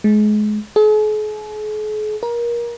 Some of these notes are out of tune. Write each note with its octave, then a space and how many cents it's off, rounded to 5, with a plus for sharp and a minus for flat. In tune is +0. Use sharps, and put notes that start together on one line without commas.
G#3 +30
G#4 +45
A#4 +25